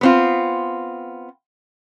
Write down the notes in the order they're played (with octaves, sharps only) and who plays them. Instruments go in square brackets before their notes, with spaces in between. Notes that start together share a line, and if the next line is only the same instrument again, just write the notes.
[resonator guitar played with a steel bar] B3 C4 F4